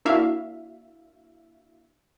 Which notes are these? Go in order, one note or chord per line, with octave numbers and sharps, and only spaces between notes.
A#3 D4 E4 F#4 E5 F5